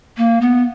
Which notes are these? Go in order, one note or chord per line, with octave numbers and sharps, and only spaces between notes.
A#3
B3